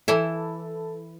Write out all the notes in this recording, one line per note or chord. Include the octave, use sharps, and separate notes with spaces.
E3 E4 A4